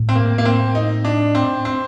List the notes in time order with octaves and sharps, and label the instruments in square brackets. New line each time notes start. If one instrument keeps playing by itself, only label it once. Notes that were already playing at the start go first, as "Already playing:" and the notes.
Already playing: [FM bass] A2
[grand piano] C4
A#3
A#3
C4
D#4
D4
C4
C4